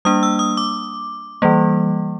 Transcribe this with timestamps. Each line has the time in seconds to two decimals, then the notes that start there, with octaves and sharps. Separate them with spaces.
0.05 G3 A#3 D4 D#6
0.23 E6
0.39 D#6
0.57 D6
1.42 E3 G3 A#3